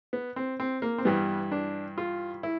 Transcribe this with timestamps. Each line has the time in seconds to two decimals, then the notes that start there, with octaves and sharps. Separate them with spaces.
0.13 B3
0.36 C4
0.60 C4
0.82 A#3
0.98 C4
1.05 G2 E3 G3 B3
1.52 D4
1.98 F4
2.43 E4